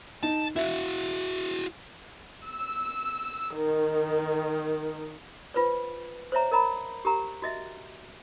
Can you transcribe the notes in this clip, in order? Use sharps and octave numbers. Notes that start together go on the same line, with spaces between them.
D#4 A5
E4 F#4 E5
E6
D#3
F4 B4 C5 D5
C5 C#5 E5 A#5
A#4 D#5 A#5 B5
G4 A#4 A#5
F#4 D#5 E5